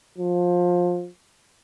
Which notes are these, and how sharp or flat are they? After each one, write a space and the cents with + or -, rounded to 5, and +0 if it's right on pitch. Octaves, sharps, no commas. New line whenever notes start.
F3 +20